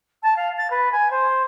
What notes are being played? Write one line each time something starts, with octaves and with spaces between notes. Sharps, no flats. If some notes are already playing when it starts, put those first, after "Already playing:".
A5
F5
A6
B4
G#5
C5